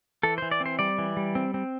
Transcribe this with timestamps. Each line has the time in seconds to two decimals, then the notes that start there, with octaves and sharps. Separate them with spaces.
0.23 E3 A4
0.38 E3 C5
0.51 D5
0.60 C4
0.66 C5
0.79 G3 D5
0.98 E3
1.17 G3
1.35 C4
1.54 C4